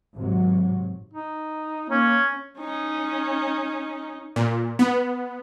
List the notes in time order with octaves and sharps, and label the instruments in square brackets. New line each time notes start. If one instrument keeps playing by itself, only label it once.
[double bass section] G#1 C3 F#3
[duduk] D#4
[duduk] A#3 [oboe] C#4
[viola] C#4 D#4
[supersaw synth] A#2
B3